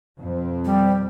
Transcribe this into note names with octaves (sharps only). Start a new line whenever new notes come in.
F2 B2 C4
G3